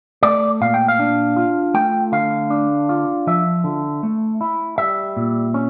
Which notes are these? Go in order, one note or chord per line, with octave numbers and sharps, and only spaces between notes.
A3 D5
A#2 F5
G5
F5
D4
F4
A3 G5
D3 F5
D4
F4
F3 E5
D3
A3
E4
G3 E5
A#2
C#4